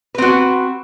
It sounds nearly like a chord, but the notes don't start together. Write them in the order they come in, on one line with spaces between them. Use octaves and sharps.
B4 C4 F#4